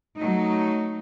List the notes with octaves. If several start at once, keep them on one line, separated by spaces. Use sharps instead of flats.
F#3 A3 D#4